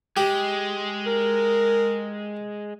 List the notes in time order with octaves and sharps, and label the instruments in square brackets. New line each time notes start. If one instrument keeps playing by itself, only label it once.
[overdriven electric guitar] G#3 [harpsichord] G4
[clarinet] A#4